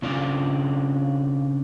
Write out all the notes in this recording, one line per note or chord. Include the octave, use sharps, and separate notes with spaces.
C#3 C4 D4 F4 D5